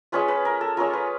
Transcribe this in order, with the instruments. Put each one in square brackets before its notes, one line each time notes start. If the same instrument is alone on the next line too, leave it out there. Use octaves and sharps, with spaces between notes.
[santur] G#3 C#4 F4 B4
B4
A#4
A4
G#3 C#4 F4 A#4
B4